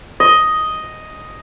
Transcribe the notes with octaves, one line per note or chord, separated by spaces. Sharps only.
D#5